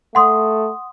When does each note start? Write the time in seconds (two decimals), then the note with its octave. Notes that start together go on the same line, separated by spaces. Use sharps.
0.15 A3 F#5 C6 D#6